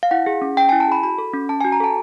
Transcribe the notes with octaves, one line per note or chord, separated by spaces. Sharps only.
F5
E4 F#5
G#4
C#4
C#4 G5
E4 G#5
A5
G#4 B5
F#4 B5
A4
C#4
C#4 A5
F#4 G#5
A#5
A4 A5